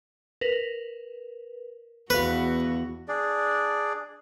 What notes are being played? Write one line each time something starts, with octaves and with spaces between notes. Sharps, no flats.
A#4 B4
E2 B3 F#4 B4 F5
D4 G#4 D5